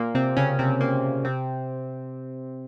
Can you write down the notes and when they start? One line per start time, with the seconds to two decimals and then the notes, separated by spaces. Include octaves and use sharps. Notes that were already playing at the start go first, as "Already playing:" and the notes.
Already playing: A#2 A#3
0.15 C3 C4
0.37 C#3 C#4
0.59 C3 C4
0.81 A#2 A#3
1.25 C3 C4